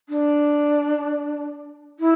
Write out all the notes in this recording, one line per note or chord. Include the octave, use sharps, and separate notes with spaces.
D4
E4